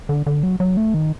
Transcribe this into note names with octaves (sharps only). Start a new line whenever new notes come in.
D3
D3
F#3
F#3
A3
D#3